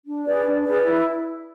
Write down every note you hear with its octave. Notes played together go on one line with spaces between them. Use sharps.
D4
G#4 B4 D5
D4
G#4 B4 D5
E4